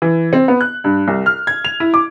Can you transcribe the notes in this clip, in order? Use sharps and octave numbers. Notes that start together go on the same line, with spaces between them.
E3
C4
B3
F#6
G2
C2
F6
G#6
F7
E4
D6